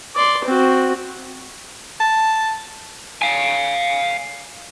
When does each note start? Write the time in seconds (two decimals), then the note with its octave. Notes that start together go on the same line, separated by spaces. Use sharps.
0.16 D5 C6
0.45 C4 F#4
2.00 A5
3.22 F5 G#5